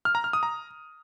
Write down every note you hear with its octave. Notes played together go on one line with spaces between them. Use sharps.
F6
A#5
F6
D#6
A#5